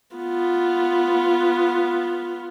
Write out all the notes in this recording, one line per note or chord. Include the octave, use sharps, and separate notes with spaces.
B3 F4